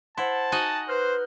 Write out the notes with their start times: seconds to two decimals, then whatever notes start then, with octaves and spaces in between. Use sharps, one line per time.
0.18 E4 C5 F#5 A5 C6
0.52 D#4 F#4 D#5 G#5
0.89 B4 C5 F6 G6